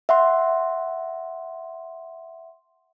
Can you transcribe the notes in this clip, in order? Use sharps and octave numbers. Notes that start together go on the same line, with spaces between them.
E5 F#5 C6